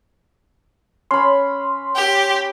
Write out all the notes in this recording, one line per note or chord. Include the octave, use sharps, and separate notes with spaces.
C#4 B5 C6
G4